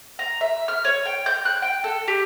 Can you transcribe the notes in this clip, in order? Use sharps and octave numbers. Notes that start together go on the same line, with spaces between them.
A#5
E5
F6
C#5
G5
G6
F#6
G5
A4
G4